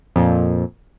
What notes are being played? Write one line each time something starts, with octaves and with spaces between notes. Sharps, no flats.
F2 A#2